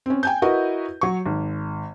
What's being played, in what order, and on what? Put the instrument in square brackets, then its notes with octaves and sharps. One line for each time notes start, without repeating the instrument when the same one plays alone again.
[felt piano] C4 C#4
G5 G#5 G6
E4 F#4 A#4 B4 D#5
F#3 C#6
G#1